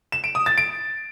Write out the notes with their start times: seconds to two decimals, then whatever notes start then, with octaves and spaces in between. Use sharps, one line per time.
0.12 E7
0.24 D7
0.35 D#6
0.46 A6
0.58 D7